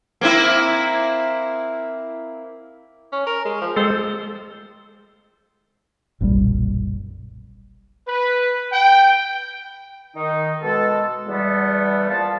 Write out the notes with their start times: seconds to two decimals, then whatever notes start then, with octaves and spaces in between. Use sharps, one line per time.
0.21 A#3 C4 E4
3.12 C#4
3.26 A#4
3.45 G#3
3.61 F3
3.76 G#3 A4 C5
6.21 F#1 B1 A#2 G3
8.07 B4
8.72 G5
10.16 D#3 D#4
10.62 B2 G#3 A4
11.26 E2 G3 A3 B3
12.09 F3 A#3 D5 F5 A5